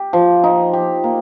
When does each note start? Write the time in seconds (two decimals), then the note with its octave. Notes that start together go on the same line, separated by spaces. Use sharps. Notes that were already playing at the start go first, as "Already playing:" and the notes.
Already playing: G4
0.13 F3
0.43 D#4
0.73 G4
1.04 A#3